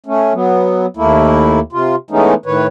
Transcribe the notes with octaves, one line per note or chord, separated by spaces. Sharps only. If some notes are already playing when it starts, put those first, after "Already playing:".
A3 C#4
F#3 B3
D#2 A3 A#3 E4
C3 F4
E3 G#3 A3 B3 C#4 D#4
A2 D#3 B4 C#5